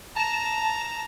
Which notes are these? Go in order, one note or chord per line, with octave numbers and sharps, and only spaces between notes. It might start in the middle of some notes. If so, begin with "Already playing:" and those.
A5 A#5 E7